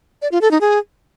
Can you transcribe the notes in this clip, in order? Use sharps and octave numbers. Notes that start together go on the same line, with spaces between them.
D5
F4
A4
D#4
G#4